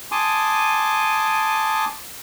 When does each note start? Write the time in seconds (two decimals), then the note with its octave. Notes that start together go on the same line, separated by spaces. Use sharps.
0.12 G#5 A5 C6 D6 D#6